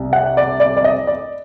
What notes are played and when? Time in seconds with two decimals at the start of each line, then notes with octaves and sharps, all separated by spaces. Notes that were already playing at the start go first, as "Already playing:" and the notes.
Already playing: C2 C3
0.13 F#5
0.37 D5
0.60 D5
0.77 D5
0.84 D#5
1.07 D5